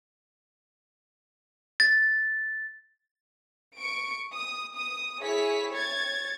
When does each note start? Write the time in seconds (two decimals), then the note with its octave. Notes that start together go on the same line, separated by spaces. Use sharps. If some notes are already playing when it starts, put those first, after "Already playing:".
1.80 A6
3.77 C#6 D7
4.31 D#6
4.73 D#6
5.22 E4 G#4 C#5 B6
5.72 C#5 G#6 A6